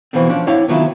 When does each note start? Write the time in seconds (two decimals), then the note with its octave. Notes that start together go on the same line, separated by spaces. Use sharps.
0.13 B2 E3 F3 B3 C4
0.30 F3 C#4 D4
0.47 C4 D4 E4 C#5 F5 F#5
0.68 C3 D#3 F#3 B3 E4 F4